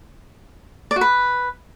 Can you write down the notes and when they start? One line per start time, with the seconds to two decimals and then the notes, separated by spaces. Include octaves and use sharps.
0.91 D5
0.96 F#4
1.01 B4